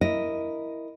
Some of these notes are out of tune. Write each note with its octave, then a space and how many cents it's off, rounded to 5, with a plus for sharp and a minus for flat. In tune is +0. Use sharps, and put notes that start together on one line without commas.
E4 +0 A#4 +0 D#5 +0